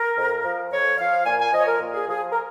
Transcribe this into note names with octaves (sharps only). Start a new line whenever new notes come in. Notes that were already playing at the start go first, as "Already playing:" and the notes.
Already playing: A#4
F2
F3
F2 C#5
F3 F5
A#2 G#5
G#5
F3 D#5
C#5
A#4
A#2
G#4
F3 G#4
A#4